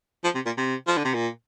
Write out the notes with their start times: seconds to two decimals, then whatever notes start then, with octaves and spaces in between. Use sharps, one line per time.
0.24 F3
0.35 C3
0.46 A#2
0.58 C3
0.87 F3
0.97 D3
1.05 C3
1.14 A#2